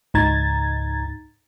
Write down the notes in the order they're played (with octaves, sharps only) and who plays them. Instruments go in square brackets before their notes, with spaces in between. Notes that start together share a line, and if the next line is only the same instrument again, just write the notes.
[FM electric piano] C#2 G#2 D#4 A#5 G#6 A6